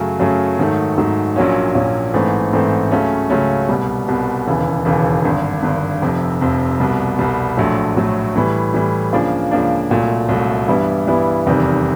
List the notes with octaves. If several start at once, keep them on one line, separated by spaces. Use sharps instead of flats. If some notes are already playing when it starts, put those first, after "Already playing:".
Already playing: F#2 C#3 F#3 A3
F#2 C#3 F#3 A3
G#2 D#3 F#3 A3
G#2 D#3 F#3 A3
A#1 A#2 F#3 A#3 C#4
A#1 A#2 F#3 A#3 C#4
A1 G#2 E3 A3 C4
A1 G#2 E3 A3 C4
C#2 C#3 F#3 A3 C#4
C#2 C#3 F#3 A3 C#4
C2 B2 G3
C2 B2 G3
E1 D#2 C#3 E3
E1 D#2 C#3 E3
G#1 G2 D3
G#1 G2 D3
F1 F2 C3
F1 F2 C3
C2 B2 G3
C2 B2 G3
A#1 A2 F#3 A3
A#1 A2 F#3 A3
A2 E3 G3
A2 E3 G3
C#2 C#3 F3 A#3 D4
C#2 C#3 F3 A#3 D4
C2 A#2 F#3 A3
C2 A#2 F#3 A3
G2 E3 G3 B3 E4
G2 E3 G3 B3 E4
F1 E2 C3 D#3 G3